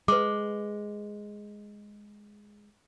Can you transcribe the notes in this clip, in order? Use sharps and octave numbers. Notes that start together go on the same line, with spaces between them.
G#3 B4 D6